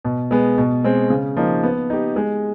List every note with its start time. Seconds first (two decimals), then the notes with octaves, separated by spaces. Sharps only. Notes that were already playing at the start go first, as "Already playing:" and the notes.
0.05 B2
0.31 G#3 B3
0.58 B2
0.84 G#3 C4
1.10 C#3
1.37 F3 A#3 D#4
1.63 B3
1.90 D#4 G4
2.16 G#3